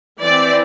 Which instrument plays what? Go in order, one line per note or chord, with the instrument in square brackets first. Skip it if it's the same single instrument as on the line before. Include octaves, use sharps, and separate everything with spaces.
[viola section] E3 C4 D5